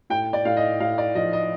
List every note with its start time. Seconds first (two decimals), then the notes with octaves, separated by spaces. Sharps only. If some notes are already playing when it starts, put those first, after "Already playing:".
0.10 A2 G5
0.33 D5
0.45 A2 F5
0.57 D#5
0.80 A2 F5
0.98 D5
1.15 F3 D#5
1.33 D#5